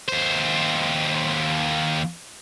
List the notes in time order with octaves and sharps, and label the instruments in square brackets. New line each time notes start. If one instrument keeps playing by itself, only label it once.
[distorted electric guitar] D#2 C5